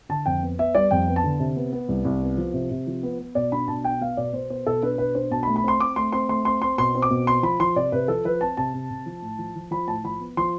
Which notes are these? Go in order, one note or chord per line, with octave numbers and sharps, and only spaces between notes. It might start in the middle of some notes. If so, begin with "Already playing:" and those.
D3 A5
F2 G5
B3
B3 E5
G3 D5
F2 G5
B3
A5
D3
C3
B3
B3
C2
C2
B3
F3
C3
C3
F3
B3
B3
B2 D5
D4 B5
B2 A5
B3 G5
B3 F5
B2 D5
B2 C5
B3 C5
B2 A4
D4 B4
B2 B4
D4 C5
B2 A5
B5
A3
B5
C4 C6
C4 D6
A3 C6
C4 C6
A3 C6
C4 C6
C4 C6
B2 C6
C4
D6
B2
C4 C6
F3 B5
F3 C6
C3 D5
C3 B4
F3 A4
F3 B4
C4 A5
C3 A5
C3
C3
F3
A2
F3
F3
F3 B5
A2 A5
F3 B5
B3
F3 C6